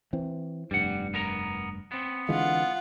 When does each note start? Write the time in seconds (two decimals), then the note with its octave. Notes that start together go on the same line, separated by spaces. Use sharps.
0.13 E3 C4
0.71 F1 G2 G3 F#5
1.14 B3 A#4 A#5
1.92 B3 C4
2.29 D3 E3 G#3 F4 F#5